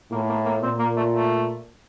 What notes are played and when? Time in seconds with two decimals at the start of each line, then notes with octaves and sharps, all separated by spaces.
0.12 A2 A#3
0.29 A#3
0.45 A#3
0.62 A#2 C4
0.79 A#3
0.97 A3
1.14 A3